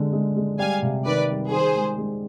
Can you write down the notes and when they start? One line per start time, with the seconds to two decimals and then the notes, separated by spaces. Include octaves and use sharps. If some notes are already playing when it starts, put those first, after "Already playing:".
Already playing: D3 G#3
0.13 G#3
0.37 G#3
0.59 G3 F5 G#5
0.82 C3
1.05 D#3 B4 D5
1.29 G3
1.51 D#3 G#4 C5
1.75 G#3
1.98 G#3